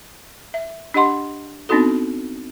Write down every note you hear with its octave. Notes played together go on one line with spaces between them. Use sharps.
E5
D4 G4 D#5 F#5 C6
B3 C4 D4 D#4 F#4 A4